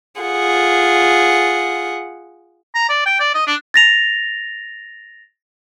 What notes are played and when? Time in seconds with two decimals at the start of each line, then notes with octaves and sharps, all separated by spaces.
0.21 F4 G#4 F#5
2.75 A#5
2.89 D5
3.06 G5
3.19 D5
3.34 D#5
3.47 D4
3.74 A6 A#6 F7